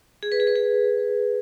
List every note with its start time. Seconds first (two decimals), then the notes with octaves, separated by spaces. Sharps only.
0.23 G#4
0.32 B4
0.40 G#4
0.47 B4
0.56 G#4